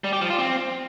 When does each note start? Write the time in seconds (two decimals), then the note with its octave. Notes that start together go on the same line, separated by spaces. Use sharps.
0.04 G3
0.13 G4
0.21 F3
0.30 F4
0.39 C4